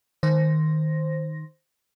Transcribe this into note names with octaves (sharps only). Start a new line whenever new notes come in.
D#3 C5 A#6